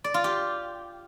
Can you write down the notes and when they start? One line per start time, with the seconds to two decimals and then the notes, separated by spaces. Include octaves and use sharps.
0.04 D5
0.14 F4
0.24 G4